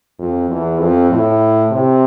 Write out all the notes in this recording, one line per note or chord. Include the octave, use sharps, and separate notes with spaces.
F2
E2
F2
A2
C3